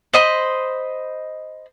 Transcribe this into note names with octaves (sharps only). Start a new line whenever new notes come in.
C5 D#5 B5